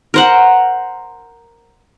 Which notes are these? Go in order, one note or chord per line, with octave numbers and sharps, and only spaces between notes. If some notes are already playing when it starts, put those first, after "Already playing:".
A#4 C5 F#5